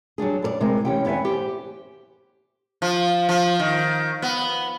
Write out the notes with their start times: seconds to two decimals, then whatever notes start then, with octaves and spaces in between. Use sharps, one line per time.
0.18 F#3 G3 D4 G#4
0.42 F#2 A#4 D5
0.61 C3 G#3 E4 A#4
0.85 E3 C#4 G4 G5
1.05 E2 B3 C#5 E5 G#5
1.25 G4 C5
2.82 F3
3.29 F3
3.60 D#3
4.22 B3